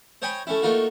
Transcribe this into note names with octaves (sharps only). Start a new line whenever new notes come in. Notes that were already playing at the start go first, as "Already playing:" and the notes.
C5 C#5 D#5 G5 G#5 B5
A3 C#4 E4
A3 A#3 D#4 F4 F#4